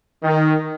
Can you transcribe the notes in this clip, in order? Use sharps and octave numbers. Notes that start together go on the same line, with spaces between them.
D#3